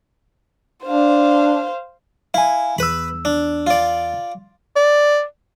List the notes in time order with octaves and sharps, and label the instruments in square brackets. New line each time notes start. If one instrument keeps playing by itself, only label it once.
[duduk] D4 [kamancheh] C5 F5
[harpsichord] E4 [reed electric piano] F5 G#5
[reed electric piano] E2 E6 [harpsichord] B4 B5
[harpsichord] D4
F4 D5
[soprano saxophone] D5